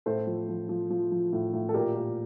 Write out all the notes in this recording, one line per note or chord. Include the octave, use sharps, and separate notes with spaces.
A2 A4 C5
F3
F3
F3
F3
F3
A2
A2
A4
A#2 G4 A#4
A#2